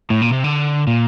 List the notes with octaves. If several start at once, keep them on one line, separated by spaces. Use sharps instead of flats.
A2
A#2
C3
D3
A#2